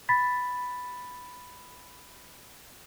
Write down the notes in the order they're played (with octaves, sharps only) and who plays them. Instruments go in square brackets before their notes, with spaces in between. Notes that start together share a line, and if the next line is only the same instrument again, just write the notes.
[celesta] B5 A6 B6